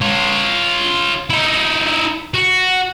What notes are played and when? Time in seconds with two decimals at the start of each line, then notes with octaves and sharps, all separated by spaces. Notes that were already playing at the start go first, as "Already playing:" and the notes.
0.01 F4 C#5
1.30 D#4 E4
2.34 F#4